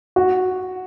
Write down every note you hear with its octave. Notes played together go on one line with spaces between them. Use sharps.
F#4